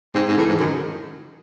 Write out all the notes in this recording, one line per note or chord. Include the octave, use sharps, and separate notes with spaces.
G#2 C4
G#2
A2 E3
G#2
F#2 D#3